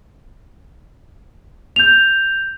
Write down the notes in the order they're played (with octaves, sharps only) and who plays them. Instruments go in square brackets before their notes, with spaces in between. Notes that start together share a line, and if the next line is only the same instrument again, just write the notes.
[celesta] G6 F7